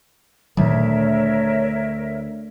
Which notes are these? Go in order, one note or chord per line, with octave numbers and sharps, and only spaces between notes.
D2 A#2 D#3 F#3 A#4 C#5 E5